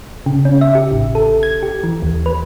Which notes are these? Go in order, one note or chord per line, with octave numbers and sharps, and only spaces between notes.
C#3
C#4
E5
G4
A1
A4
G#6
G4
E3
D#2
B4